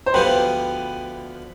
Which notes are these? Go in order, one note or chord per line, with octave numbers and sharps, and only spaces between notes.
C5
D2 D3 F3 B3 G4 B4